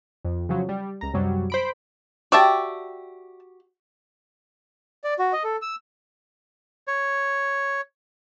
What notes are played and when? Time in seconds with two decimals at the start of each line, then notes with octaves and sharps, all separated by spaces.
0.25 F2
0.49 C#3 F3 F#3
0.69 G3
1.01 C#2 A#5
1.14 F#2 C3 F#3 G3
1.50 C5 B5 D7
2.32 F#4 G4 D5 E5 A5
5.04 D5
5.19 F#4
5.33 D#5
5.44 A4
5.62 E6
6.87 C#5